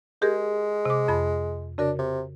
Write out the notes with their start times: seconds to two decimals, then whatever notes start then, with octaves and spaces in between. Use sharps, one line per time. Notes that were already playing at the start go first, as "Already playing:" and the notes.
0.22 G#3 G4 G#4 A#4
0.85 C3 D6
1.08 F2 B5
1.78 C#3 D4 F#4 A#4
1.99 C3